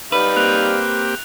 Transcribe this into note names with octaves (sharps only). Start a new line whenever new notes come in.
G3 D#4 B4 F5
A#3 C4 G4 F#6 F7